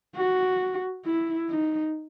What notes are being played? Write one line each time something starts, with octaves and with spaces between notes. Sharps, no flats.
F#4
E4
D#4